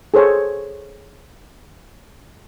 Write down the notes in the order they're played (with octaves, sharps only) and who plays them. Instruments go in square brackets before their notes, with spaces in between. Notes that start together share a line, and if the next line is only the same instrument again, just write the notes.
[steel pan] G#4 A4 C5 C#5 G#5